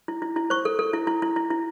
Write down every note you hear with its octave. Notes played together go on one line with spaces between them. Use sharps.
E4
E4
E4
C5 C#6
A4
A4
E4
E4
E4
E4
E4